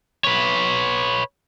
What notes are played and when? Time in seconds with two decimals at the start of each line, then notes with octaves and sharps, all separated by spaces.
0.25 B4 C#5